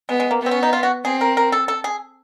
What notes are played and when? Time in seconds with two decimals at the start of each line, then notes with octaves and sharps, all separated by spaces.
0.09 G#3 B3
0.20 G#3
0.31 A#3
0.41 B3
0.46 C4
0.51 C#4
0.63 D#4
0.73 F4
0.83 F#4
1.04 C4 G#4
1.21 A#4
1.37 A#4
1.52 A4
1.68 A4
1.84 G#4